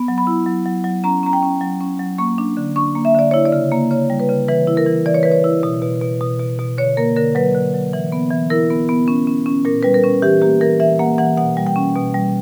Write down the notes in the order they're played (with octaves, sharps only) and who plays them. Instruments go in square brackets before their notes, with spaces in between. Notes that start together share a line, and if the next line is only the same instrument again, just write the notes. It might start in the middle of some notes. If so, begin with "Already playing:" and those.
Already playing: [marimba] B3
F#3
B5
E4
F#3
F#3
F#3
C#4 A#5
C#4 A#5
G5
C#4
F#3
C#4
F#3
A#3 C#6
D4
D3
D4 C#6
A#3
E5
D3 D5
E4 C#5
D5
C#3
A#3
C#3 C#5
G3
B4
C#3
E3 B4
E4
A#4
E3
E3 D5
C#5
E3 B4
C#5
E4
B2
B2
B2
B2
B2
B2
D3 C#5
A#3 A#4
D3 A#4
F#3 B4
D3
F#3
E3
B3
E3
E4 A#4
B3
B3
C#4
C#4
C#4
A#2 A#4
G3 B4
A#4
C#4
E3 G4
A#3 G4
E3 A#4
E3 E5
A#3 F#5
E3 F#5
B2 F#5
G3
G5
C#4
B2
G3